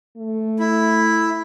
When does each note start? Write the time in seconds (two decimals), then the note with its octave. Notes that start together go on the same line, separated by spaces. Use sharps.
0.17 A3
0.59 E4